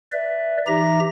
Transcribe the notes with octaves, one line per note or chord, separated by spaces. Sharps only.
B4 D5 E5
E3 D#4 G4 E5 A#5 A#6